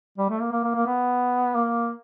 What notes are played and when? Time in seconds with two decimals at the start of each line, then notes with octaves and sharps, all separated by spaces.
0.18 G3
0.29 A3
0.41 A#3
0.52 A#3
0.64 A#3
0.75 A#3
0.87 B3
1.56 A#3